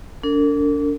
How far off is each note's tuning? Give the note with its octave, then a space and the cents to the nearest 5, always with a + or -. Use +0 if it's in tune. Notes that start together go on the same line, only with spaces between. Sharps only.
D4 -35 A#4 -45